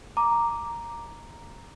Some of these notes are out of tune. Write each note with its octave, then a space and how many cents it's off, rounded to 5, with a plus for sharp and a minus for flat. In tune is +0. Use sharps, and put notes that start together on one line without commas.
A#5 +0 D6 +0